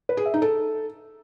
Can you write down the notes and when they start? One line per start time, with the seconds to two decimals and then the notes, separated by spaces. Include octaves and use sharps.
0.09 B4
0.17 G#4
0.25 E5
0.34 D#4
0.42 A4